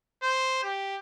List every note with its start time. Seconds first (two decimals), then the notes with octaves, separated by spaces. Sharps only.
0.22 C5
0.63 G4